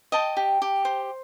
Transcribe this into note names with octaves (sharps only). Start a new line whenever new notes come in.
D#5 G5 A5
G4
G4
C5